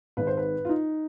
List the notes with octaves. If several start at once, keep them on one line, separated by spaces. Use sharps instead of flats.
G#1 G#2 D#3 B4
C5
B4
F4
D#4